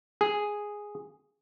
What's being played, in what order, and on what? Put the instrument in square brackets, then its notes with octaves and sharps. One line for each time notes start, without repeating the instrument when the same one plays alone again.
[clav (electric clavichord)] G#4